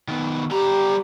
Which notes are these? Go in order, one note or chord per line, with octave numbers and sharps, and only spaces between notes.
D#3 B3
G3 G4 A#5